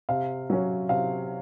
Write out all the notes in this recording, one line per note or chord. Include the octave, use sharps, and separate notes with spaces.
C3 F5
F#3 C#4
C3 F5